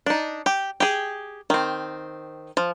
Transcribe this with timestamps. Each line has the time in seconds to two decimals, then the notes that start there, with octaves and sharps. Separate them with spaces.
0.06 D4 D#4
0.46 G4
0.80 G4 G#4
1.50 D#3 C4
2.57 F3